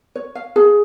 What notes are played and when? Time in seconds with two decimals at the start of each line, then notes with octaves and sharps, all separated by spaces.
0.15 C#5
0.35 F5
0.56 G#4